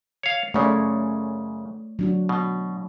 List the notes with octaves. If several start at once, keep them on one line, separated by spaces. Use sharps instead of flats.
C#5 F5
F#2 C#3 A3 C#5 D5
F#3 D4 F#4
B2